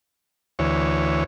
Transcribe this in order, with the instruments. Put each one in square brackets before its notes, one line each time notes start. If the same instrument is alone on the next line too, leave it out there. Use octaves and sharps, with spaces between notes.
[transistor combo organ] D2 E3 C#5